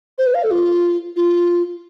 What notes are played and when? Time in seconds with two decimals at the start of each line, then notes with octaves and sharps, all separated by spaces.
0.18 C5
0.26 B4
0.34 F5
0.43 A4
0.51 F4
1.16 F4